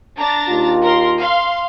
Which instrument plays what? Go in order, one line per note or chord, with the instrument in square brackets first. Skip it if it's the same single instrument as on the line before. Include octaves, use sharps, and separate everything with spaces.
[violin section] D4 A#5 A6
[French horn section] D#2 F4
[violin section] A#4 C6
F5 C6